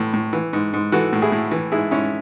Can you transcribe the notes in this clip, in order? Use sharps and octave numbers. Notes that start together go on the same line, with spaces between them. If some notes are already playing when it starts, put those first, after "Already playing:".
Already playing: A2 E3
A2
E3
G#2
G#2
E3 F#4 A4
A2
E4 G#4
A2
E3
G#2 E4 G#4
G#2 C#4 E4